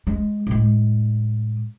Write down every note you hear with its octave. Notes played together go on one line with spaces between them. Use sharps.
G#3
A2 G#3